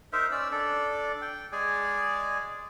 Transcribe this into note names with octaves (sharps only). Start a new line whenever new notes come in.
D#4 A#4 C5 E5
C#4 D5 E6
D4 A4 D5
G5
G#3 G#4 D5 G#5